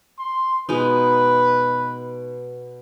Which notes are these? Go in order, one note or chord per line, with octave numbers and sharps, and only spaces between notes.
C6
B2 G#3 D#4 B4